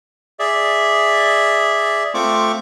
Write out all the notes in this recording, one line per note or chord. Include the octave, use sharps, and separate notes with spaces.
G#4 D5 E5
A3 C4 F4 C#6 D6